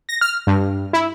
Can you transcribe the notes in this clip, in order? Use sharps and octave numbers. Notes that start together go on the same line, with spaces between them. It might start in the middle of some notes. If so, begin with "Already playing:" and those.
A#6
F6
G2
E4